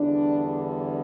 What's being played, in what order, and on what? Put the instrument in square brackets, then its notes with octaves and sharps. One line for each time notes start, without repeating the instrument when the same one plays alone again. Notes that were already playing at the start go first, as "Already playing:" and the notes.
Already playing: [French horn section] E2 D3 G3 D4